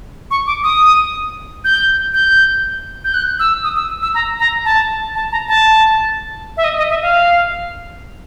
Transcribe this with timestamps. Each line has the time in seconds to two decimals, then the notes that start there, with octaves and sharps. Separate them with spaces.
0.31 C#6
0.47 D6
0.63 D#6
1.64 G6
2.14 G6
3.04 G6
3.14 F#6
3.39 E6
3.64 D#6
3.76 E6
4.03 E6
4.15 A#5
4.40 A#5
4.65 A5
5.15 A5
5.32 A#5
5.48 A5
6.57 E5
6.64 D#5
6.78 D#5
6.90 E5
7.02 F5